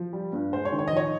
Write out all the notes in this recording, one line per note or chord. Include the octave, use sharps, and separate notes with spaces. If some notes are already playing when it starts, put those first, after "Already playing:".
Already playing: F3
G3
G2
G#3 C5
C#5
D#3
C#5
D#5
F3 C#5